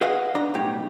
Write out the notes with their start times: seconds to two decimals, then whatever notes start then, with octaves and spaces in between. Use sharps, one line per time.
0.01 G#4 B4 D#5 F5 F#5
0.35 D4 A#5
0.54 B1 A2 G3 G4